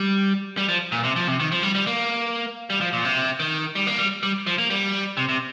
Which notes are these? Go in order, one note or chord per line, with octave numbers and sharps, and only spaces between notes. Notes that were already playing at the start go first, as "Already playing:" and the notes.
Already playing: G3
G3
F3
A#2
C3
F3
C3
D#3
F3
G3
G3
A#3
G3
F3
A#2
C3
D#3
G3
A#3
G3
G3
F3
A#3
G3
C3
C3